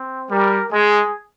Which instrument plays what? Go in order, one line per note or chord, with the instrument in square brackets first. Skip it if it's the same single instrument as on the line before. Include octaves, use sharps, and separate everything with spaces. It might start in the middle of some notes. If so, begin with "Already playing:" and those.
Already playing: [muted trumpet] C4
[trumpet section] G3 [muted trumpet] A#4
[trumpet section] G#3 [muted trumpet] G#4